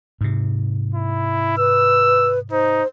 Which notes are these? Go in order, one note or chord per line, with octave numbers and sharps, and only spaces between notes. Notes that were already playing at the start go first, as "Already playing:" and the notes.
G#2 C3
E4
B4 E6
D#4 C5